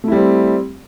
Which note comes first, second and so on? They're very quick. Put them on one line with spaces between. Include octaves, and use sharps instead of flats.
A3 E4 G3 C4